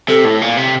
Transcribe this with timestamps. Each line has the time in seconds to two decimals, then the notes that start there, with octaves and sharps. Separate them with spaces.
0.08 C3 A4
0.25 A2
0.41 A#2
0.57 C3